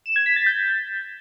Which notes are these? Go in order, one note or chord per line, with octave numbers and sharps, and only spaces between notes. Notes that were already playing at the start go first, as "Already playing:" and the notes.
E7
G#6
B6
A6
G6